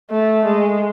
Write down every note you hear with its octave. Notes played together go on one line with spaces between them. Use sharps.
A3
G#3